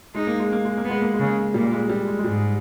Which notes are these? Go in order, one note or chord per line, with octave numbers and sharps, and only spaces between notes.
G#3 D#4
A#3
G#3
A#3
G#3
A#3
B3
G#3
A#3
G#3
C#3
A#2 G3
G#3
G3
G#3
G#3
G#2 G3